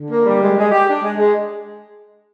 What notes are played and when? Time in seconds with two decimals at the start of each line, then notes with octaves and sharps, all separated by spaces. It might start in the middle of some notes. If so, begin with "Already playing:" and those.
Already playing: D3
0.09 A#3
0.26 G3
0.41 G#3
0.57 G#3
0.72 G4
0.88 D4
1.03 G#3
1.17 G#3